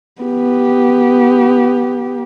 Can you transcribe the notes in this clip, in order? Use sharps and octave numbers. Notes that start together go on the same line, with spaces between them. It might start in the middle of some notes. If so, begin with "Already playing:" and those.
B3 G4